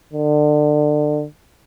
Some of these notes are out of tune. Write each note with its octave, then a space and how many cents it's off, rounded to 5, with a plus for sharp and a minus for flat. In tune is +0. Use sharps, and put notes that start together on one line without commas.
D3 +30